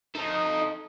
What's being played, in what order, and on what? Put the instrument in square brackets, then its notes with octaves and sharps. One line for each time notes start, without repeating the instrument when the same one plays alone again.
[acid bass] D#4 [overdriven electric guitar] A4 D#5